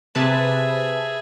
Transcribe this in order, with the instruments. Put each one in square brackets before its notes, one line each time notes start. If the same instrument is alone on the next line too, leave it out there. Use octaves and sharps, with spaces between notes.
[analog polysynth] C3 B4 A5 [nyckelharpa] G#4 E5